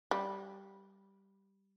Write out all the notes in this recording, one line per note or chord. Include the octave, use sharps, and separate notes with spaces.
G3